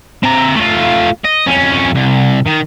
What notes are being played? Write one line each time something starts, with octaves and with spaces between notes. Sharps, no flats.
C4 A#5
A3 F4
D#5
F2 C#4
C2
D#3